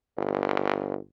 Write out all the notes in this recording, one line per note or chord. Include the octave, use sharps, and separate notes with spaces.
G1